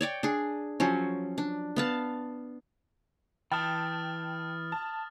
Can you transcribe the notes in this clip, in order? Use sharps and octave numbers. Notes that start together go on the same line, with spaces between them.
C#5 D5 G5
D4 G#4
F3 F#3 C#4
D4
B3 F5 A5
E3 G5 A5 D#6 F6 A6
A5